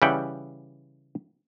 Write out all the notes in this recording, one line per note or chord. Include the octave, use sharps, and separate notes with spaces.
C#3 E3 G3 E5 F#5 G5